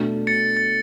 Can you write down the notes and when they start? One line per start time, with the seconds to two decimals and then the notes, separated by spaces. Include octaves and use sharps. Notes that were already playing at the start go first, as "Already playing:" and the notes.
Already playing: B2 A3 D4 F#4
0.27 A6 C#7
0.57 A6